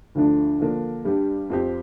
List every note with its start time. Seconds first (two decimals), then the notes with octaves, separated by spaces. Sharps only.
0.15 D2 D3 F3 D4
0.60 D3 F3 A#3 D4
1.05 G2 G3 D4 G4
1.50 F2 F3 C4 G4